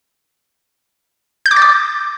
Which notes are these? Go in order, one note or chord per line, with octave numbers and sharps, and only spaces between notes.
G6
D6
A6
D6